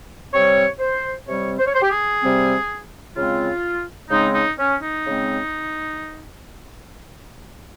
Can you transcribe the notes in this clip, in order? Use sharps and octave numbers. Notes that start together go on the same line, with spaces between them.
C3 G3 C4 C#5
C5
C3 G3 C4 C#5
C5
C#5
C5
G4
G#4
C3 G3 C4
C#3 G#3 C4 F4
C#3 G#3 C4 D#4
D#4
C#4
D#4
C#3 G#3 C4